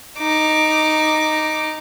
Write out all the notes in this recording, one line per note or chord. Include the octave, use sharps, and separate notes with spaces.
D#4 D6